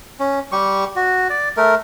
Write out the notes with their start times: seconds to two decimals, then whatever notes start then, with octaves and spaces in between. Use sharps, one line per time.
0.20 C#4
0.52 G3 G4 C#6
0.96 F#4
1.30 D5
1.57 A3 A#4